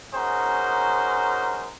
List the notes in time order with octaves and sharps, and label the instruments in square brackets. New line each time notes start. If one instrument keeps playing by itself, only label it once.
[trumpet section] C#4 D#4 F#4 G#4 A#4 C5